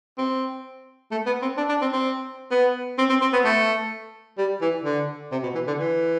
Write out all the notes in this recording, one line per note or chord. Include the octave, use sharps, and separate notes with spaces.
C4
A3
B3
C4
D4
D4
C4
C4
B3
C4
C4
C4
B3
A3
G3
E3
D3
C3
B2
E3
D3
E3